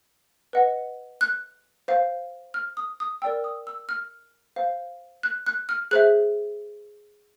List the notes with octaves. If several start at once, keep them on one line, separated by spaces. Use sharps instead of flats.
B4 D#5 F#5
F#6
C5 F5
F6
D#6
D#6
A#4 D5 G5 E6
D#6
E6
F6
C5 F5
F#6
F#6
F6
G#4 C5 E5 F#6